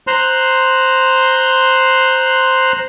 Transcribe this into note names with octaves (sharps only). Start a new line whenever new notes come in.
C5 A#5 C6 F#6